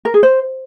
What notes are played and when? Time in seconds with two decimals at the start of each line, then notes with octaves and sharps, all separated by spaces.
0.05 A#4
0.14 G#4
0.23 C5